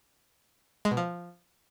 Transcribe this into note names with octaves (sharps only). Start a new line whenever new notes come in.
G#3
B2
F3